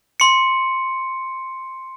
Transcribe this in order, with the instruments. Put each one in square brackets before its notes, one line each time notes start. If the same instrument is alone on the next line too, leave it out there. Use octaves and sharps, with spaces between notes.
[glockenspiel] C6 C#7